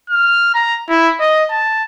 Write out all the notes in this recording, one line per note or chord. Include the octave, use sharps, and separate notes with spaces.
F6
A#5
E4
D#5
A5